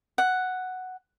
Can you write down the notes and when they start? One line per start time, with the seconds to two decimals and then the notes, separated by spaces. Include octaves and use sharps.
0.18 F#5